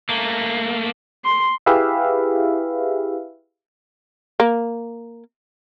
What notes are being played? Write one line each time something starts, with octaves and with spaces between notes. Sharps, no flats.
A3 A#3
C6
E4 G4 G#4 B4 E5 F5
A#3